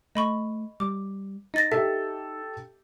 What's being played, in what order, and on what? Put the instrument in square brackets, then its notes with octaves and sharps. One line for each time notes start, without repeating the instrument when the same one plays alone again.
[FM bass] A3 [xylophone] D#5 B5 C#6
[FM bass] G3 [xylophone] D6
[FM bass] D#4 [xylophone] D#5 A6 A#6
[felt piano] G4 A4 [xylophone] E5